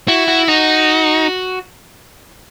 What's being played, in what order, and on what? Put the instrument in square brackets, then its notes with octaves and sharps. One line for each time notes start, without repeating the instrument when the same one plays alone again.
[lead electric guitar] E4 [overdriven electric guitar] F#4
[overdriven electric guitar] F#4
[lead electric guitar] D#4 [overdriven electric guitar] F#4